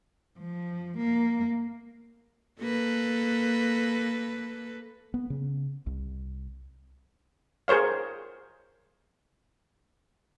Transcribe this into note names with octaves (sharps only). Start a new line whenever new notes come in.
F3
A#3
A#3 A4 B4
B3
C#3
C2
G#4 A#4 C5 C#5 F5